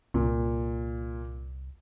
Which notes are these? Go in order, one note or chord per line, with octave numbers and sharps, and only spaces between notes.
C2 A#2